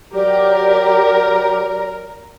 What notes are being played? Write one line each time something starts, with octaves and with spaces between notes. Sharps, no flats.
F#3 G4 A#4 D5